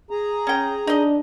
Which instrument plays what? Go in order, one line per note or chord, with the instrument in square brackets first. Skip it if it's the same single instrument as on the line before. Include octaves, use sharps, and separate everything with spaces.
[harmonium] G#4 A#5
[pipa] C#4 G5
[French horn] D4 [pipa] D#4 D#5